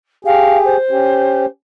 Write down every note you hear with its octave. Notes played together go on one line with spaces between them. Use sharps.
G4 G#4 F5
C5
C#4 G4